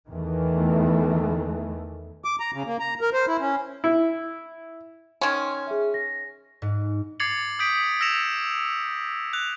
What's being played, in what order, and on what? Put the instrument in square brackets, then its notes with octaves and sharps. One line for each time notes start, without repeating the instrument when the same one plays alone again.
[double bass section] E2 D#3 E3 A3
[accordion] D6
A#5
C#3
A#3
A#5
A#4
C5
E4
C#4
[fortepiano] E4
[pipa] D#3 C#4 [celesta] C6 F6 G#6
[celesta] G#4 E5
A#6
[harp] G#2
[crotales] D6 G#6 A6 C7 C#7 F#7
D#6 G6 B6 D7
E6 A#6 C#7 E7 F7
F#6 F7